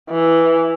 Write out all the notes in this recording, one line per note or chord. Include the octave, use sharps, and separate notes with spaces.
E3